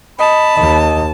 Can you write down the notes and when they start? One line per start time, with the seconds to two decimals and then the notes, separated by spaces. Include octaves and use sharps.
0.19 D#5 A5 B5
0.57 D#2 D#5